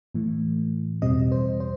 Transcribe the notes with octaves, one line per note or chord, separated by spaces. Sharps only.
A2 E3 A3
E2 B2 G3 C4 D#5
C5
C5